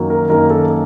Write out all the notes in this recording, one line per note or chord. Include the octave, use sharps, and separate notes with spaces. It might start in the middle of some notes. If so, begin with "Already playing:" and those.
Already playing: F#2 D#3 F#3 A#3
A#4
F#2 D#3 F#3 A#3 A#4
A4